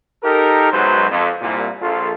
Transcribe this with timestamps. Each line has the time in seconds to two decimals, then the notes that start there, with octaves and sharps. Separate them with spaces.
0.23 D#4 G4 A4 A#4
0.72 B1 F#2 F#3 G#3 B4 C5
1.10 F2
1.41 C2 A#2
1.81 A#1 F4 A4